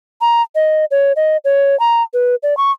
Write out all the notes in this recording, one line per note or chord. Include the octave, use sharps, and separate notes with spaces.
A#5
D#5
C#5
D#5
C#5
A#5
B4
D5
C#6